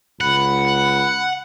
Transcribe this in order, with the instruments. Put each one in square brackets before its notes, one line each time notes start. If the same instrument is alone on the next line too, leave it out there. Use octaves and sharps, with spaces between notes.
[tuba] C#2 [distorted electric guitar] F#5 [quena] B5